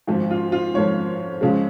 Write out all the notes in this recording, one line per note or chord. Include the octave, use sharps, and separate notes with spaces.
G#1 G#2 F3
F4
F4
G#1 G#2 F3 C#5
C#2 C#3 F3 G#3